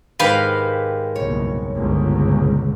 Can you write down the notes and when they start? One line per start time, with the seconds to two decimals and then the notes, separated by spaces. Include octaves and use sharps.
0.20 G#2 D#3 G4 B4 F5
1.16 F#1 C2 B2 C#5
1.75 G1 C#2 A#2